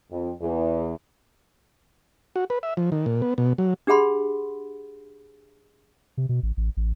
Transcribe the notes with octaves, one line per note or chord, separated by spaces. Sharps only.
F2
E2
F#4
B4
E5
F3
D#3
A#2
B3
B2
F#3
D4 G4 G#4 F#5 B5 C6
C3
B2
A1
A1
A1